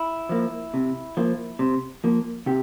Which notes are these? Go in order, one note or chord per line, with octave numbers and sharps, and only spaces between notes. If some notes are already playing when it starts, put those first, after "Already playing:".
Already playing: E4
F3 A#3
C3
F3 A#3
C3
F3 A#3
C3 G4